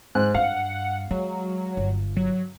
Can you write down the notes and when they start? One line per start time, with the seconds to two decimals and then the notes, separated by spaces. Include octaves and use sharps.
0.15 G#2 F#6
0.34 G2 F5 F#5
1.11 F#3 G#3
1.77 G1
2.17 F#3